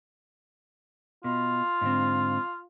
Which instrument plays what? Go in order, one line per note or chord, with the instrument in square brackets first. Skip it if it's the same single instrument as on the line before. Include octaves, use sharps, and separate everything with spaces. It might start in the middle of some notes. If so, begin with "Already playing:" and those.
[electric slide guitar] B2 [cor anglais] F4
[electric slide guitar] G#2 D3 C4